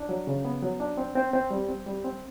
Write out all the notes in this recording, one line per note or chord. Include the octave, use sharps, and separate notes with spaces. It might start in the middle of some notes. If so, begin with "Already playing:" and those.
Already playing: D4
F#3
C#3
B3
F#3
D4
C4
C4
C4
G3
C4
G3
C4